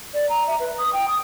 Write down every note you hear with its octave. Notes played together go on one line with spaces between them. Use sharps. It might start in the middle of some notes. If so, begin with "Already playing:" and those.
D5
A#5
E5
B4
D#6
G5
D#6